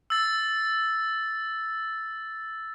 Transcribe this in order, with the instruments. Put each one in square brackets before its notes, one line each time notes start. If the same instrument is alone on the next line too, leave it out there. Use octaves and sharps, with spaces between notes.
[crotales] E6 A6